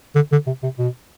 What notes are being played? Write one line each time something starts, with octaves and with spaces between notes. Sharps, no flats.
D3
D3
C3
C3
B2